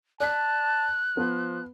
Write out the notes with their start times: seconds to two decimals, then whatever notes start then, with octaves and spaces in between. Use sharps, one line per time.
0.20 D5 A5 F#6 B6
1.17 F3 B3